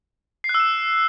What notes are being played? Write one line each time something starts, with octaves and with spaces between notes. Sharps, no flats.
C7
F#6
E6
E7